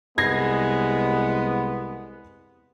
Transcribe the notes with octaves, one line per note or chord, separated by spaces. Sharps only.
C2 G#3 B3 G#6 A#6 C7